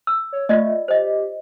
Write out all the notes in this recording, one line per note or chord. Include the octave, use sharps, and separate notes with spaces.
E6
C#5
A3 F4 D5 D#5
G4 C5 D#5